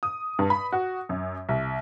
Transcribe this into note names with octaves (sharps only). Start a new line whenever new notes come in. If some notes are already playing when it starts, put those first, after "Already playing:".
D#6
G2
B5
F#4
F#2
C2